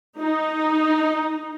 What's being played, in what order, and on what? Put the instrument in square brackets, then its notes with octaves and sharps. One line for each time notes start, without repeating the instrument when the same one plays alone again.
[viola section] D#4